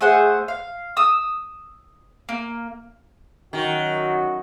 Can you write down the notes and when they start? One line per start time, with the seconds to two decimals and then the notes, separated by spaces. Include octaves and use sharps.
0.01 A3 G#4 C5 F#5
0.48 F5
0.97 D#6 E6
2.29 A#3
3.53 F#2 D#3 F#3 F#4